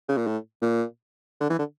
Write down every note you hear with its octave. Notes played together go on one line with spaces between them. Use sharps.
C#3
A#2
A2
A#2
D3
E3
D3